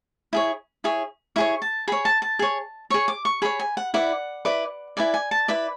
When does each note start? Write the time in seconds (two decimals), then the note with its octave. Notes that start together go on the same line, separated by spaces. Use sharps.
0.33 E4 G#4 C#5
0.84 E4 G#4 C#5
1.36 E4 G#4 C#5 C#6
1.62 A5
1.88 G#4 C#5 B5
2.05 A5
2.22 A5
2.39 G#4 C#5
2.90 G#4 C#5 C#6
3.08 D6
3.25 C#6
3.42 G#4 C#5 B5
3.59 G#5
3.77 F#5
3.94 E4 B4 D5 F#5
4.45 E4 B4 D5
4.97 E4 B4 D5 G#5
5.14 G#5
5.31 A5
5.48 E4 B4 D5 B5